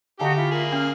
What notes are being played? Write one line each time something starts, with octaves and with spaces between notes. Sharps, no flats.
D3 D#4 F#4 G4 F5 G#5 A#5
E4 F4
A#3 G#4
C#4 F6